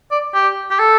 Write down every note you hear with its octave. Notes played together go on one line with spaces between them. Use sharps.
D5
G4
G4
A4